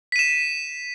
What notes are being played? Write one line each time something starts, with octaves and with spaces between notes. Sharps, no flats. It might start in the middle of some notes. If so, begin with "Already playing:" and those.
B6 D#7 E7